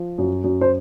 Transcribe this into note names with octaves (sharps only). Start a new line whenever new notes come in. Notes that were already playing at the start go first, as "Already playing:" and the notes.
Already playing: F3
F#2
F#2
C5